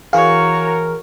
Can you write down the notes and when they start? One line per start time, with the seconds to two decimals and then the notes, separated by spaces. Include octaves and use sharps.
0.13 E3 F#4 G#4 A#4 C#5 F5